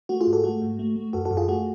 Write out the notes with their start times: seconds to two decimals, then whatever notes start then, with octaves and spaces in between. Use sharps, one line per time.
0.09 A3 F#4
0.21 F4 G#4
0.27 G#2
0.33 F#4 A4
0.44 A3 F#4
0.62 G#2
0.79 A3
0.96 A3
1.13 F#2 F#4 A4
1.25 F#4 A4
1.31 F#2
1.37 F4 G#4
1.48 A3 F#4